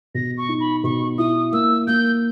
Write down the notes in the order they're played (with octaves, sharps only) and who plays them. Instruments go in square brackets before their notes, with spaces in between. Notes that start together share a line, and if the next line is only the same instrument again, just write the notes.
[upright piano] B2 [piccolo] A#6
[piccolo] C#6
[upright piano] D#4
[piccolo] B5
[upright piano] B2 [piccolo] C#6
[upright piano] E4 [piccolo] D#6
[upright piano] A#3 [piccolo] E6
[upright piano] A#3 [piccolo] G6